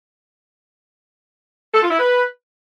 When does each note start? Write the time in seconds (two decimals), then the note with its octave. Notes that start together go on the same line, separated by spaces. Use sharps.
1.74 A4
1.82 F4
1.90 E4
1.99 B4